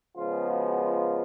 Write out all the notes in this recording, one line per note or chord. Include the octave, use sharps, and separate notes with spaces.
C#3 F3 G#3 B3 F4
F#4
F4